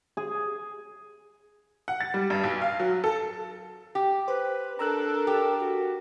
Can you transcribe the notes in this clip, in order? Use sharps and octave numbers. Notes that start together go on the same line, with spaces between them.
G#4
F#5
A6
G3
G2
B1
F5
F#3
A4
G4
B4 C5
D4 A4 A#4 A#5 E6 F#6
G4
F#4